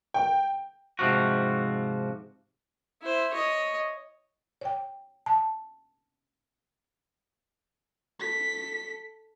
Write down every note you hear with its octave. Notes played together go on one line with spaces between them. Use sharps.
G5
G#2 C3 F3 F#4
E4 C5
C#5 D#5
C#5 G5
A5
A4 B6